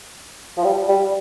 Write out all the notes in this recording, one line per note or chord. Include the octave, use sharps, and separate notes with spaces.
F3
G3
G3